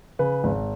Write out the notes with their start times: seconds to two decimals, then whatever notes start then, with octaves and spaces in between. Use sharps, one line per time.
0.19 C#3 B4
0.44 G#1